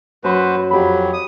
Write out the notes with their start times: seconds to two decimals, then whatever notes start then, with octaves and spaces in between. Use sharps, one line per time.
0.24 F#2 F#4 B4 C5
0.71 F2 F#3 G4 B5
1.13 D#6